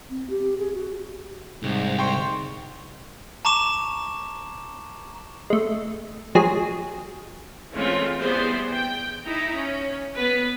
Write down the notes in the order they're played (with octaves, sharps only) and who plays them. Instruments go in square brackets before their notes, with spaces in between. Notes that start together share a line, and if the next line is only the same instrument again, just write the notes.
[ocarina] C4
G4
G#4
F#4
[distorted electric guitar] C2 [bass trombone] G#2
[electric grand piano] G5 C6 C#6
[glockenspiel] A5 A#5 C#6 D6 E7
[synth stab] G#3 A3
F3 F#3 G#3 G4 G#4
[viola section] E3 G#3 A3 C4 C#4 F4
E3 G3 B3 G#4 C5 D5
G5
D#4 E4 A#5
C#4
B3 B4